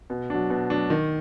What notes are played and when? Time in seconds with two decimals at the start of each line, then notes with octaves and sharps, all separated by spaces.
0.10 B2
0.30 F#3 D4
0.50 B2
0.70 F#3 D4
0.90 D#3